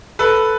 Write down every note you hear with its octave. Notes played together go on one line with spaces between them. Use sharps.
A4 B4